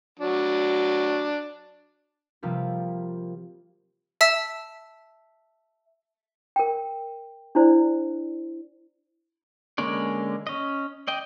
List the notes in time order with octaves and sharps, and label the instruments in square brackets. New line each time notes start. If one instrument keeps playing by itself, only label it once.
[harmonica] F#3 D4
[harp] C3 F3 G3 A#3 F4 G4
[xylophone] E5 A5 E6 B6
[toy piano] A#4 G5
D4 E4 C5 D5
[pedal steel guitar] D3 G#3 A#3 C#4 D5
C#4 D#5
D5 D#5 G5